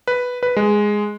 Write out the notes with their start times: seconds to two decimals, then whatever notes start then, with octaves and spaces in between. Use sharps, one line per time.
0.08 B4
0.43 B4
0.57 G#3